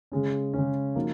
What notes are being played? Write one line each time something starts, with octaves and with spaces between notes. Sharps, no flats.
C#3 G#3 C#4
C#3 G#3 C#4
F3 A#3 D#4 F#4